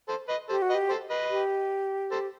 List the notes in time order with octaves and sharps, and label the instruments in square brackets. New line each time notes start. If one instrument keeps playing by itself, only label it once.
[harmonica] A4 C5
B4 D#5
[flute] G4 [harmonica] A4 C5
[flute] F#4
[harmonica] B4 D#5
[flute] G4
[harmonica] A4 C5
B4 D#5
[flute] G4
[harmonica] A4 C5